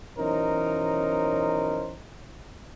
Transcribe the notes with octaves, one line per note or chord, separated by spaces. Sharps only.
B1 E3 C#4 D#4 A#4 C5